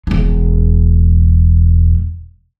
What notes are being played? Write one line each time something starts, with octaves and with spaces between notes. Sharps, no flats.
E1 G#3